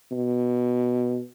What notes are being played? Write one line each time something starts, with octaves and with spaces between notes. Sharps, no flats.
B2